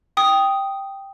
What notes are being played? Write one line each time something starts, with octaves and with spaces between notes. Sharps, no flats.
G5 D#6